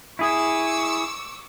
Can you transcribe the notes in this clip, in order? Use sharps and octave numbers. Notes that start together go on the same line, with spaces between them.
E4 G#4 C#6 D6 E6